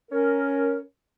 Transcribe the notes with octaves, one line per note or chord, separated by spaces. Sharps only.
C#4 A#4